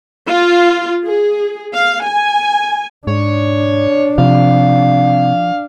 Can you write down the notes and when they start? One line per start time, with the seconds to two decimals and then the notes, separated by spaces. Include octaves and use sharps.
0.28 F4
1.05 G#4
1.74 F5
2.03 G#5
3.07 G#2 D4 C#5
4.18 C3 F3 F5